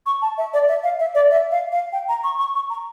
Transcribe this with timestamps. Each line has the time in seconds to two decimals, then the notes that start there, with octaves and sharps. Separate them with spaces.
0.06 C#6
0.22 A5
0.38 E5
0.54 D5
0.68 E5
0.84 F5
0.99 E5
1.15 D5
1.31 E5
1.51 F5
1.72 F5
1.92 G5
2.09 A#5
2.24 C#6
2.39 C#6
2.55 C#6
2.70 A#5